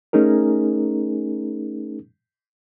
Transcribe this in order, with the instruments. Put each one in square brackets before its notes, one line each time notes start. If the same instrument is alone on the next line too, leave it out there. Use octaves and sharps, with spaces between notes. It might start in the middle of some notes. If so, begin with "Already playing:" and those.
[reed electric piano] A3 C#4 D#4 G#4 A#4